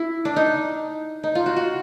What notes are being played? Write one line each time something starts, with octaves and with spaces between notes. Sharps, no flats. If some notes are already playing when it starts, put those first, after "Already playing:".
Already playing: E4
D4
D#4
D#4
F4
F#4
F#4